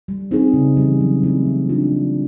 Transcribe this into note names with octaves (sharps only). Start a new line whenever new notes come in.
G3
C4 D#4 G#4
C#3
E3 G3
F#3
A3 C4 E4
A3
D4 F4
F3